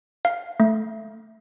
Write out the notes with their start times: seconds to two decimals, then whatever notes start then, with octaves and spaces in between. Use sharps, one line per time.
0.25 F5
0.60 A3